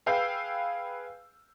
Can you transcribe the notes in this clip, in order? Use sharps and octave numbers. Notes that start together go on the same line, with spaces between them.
G#4 B4 F5 G5 E6 G6